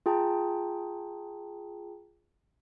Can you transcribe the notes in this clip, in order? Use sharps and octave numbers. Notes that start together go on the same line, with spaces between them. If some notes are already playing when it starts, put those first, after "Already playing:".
F4 G#4 G5 A5 A#5